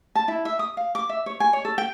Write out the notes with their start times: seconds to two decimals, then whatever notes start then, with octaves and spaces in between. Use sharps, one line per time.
0.15 A5
0.28 E4
0.45 E5
0.59 D#6
0.77 F5
0.95 D6
1.09 E5
1.26 C#5
1.40 G#5
1.53 C#5
1.65 A4
1.78 G5